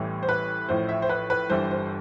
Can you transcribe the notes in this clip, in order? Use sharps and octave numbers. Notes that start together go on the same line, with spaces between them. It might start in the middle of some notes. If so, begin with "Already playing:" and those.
Already playing: A1 A2 E3 G3
C5
B4
A1 A2 F3 C5
E5
C5
B4
B4
G1 G2 E3 G3 C5
C5